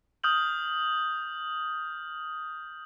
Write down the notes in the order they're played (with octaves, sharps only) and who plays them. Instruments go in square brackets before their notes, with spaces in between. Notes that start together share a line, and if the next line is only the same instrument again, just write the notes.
[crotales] D#6 F6 G6 F#7